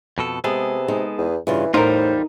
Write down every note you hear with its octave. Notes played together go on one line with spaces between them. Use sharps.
F2 B2 A4
C3 G#3 B3 G#4 A4
G#3 D#4
E2
G2 C#3 E3 F4
E2 A2 G3 D#4 F4 A#4 C5